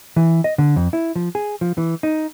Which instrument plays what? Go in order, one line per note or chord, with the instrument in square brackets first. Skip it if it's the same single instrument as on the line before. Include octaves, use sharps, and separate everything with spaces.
[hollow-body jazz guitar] E3
D#5
D3
F2
E4
F3
G#4
F3
E3
D#4